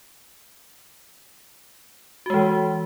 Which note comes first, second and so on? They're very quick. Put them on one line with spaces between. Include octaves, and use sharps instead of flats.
F#4 G#3 E3